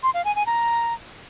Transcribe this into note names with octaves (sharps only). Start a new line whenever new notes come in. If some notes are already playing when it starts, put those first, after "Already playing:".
C6
F5
G#5
G#5
A#5